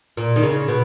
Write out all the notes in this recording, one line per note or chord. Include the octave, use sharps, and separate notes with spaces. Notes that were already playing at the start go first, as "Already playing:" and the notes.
A#2
D#3
C#3
B2